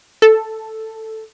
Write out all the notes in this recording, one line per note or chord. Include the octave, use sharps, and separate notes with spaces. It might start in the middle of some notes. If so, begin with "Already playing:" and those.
A4